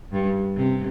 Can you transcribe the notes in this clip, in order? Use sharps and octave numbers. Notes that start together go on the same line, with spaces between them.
G2
C3